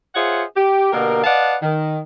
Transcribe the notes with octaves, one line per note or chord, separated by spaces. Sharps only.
F4 G#4 C5 C#5 E5 F#5
G4
B2 D3 A#3 G4 A#4
B4 D5 D#5 F5 F#5 A5
D#3